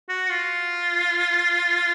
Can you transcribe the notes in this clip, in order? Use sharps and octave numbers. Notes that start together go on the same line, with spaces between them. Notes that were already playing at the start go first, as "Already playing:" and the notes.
F#4
F4